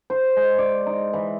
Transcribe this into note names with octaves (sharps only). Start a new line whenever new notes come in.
C5
G#3
D5
D#4
E3